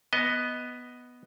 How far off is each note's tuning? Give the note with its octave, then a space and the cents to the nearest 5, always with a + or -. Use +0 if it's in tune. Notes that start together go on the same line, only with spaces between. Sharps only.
B3 +0 D#5 +10